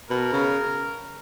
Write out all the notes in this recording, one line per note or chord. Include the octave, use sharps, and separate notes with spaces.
B2 A#4
C#3